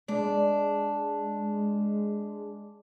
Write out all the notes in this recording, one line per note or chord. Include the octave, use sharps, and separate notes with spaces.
G#3 D4